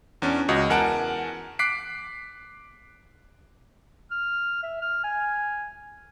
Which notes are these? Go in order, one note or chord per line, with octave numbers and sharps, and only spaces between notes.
E2 C#4 D4
C#2 F#4 D#5
E2 A#4 F#5 G#5 A5 D7
D6 F#6 B6 C7 D7
F6
E5
F6
G#5